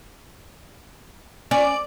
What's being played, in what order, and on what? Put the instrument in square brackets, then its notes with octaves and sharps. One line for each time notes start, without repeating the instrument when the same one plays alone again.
[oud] C#4 [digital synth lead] D5